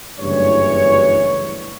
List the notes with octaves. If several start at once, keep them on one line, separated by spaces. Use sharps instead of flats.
F#1 D2 G2 E3 C#5